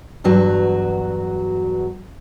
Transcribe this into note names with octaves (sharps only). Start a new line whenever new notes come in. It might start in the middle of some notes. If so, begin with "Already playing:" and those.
E2 G2 F#3 F#4